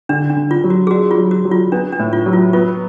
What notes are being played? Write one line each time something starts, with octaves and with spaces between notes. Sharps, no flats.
D3 D4
D4
D3
F4
F#3
F#4
G#4
D4 F#4
F4
F#3
F#4
F#3
F4
B3 D4
D4
A2
F4
F#3
F4
B3 F4